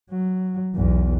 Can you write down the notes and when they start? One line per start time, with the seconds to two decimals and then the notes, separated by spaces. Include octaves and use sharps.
0.11 F#3
0.75 B1 E2